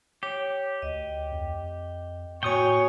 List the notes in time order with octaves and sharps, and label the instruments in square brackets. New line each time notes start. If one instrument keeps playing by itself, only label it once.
[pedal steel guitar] G4 [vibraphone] C#5
[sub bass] D2 [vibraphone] D#5
[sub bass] F2
[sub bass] A2 [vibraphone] A#3 F#4 G#5 [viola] C#5 [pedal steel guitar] G5 D#6